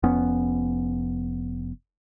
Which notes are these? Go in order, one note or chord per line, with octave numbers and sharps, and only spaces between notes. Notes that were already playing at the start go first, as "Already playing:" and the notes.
F1 F2 B3 C#4